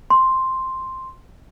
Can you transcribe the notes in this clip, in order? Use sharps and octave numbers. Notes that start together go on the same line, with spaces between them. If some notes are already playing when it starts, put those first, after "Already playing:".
C6